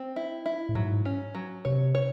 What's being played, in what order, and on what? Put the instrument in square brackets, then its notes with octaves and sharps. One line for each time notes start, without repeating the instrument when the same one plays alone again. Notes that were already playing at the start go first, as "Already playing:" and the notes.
Already playing: [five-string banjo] C4
E4
E4
[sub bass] A2
[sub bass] G#2 [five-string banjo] F#3
[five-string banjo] C#4
F#3
[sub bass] C3 [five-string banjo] C#5
[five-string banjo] C#5